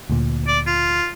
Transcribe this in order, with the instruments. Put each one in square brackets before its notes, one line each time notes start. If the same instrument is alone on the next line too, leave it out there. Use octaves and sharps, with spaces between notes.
[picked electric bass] D2 A#2
[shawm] D5
F4